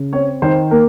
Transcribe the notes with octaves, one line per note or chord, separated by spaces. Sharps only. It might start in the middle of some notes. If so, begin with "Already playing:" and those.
Already playing: C#3
C4 C#5
D#3 C5
A#3 A#4